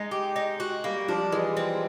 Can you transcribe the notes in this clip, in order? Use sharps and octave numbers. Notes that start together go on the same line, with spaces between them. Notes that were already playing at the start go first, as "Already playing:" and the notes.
Already playing: G#3 D#4
G4
D#4
F#4
G3 A#3
F3 D4
E3 G#3
C4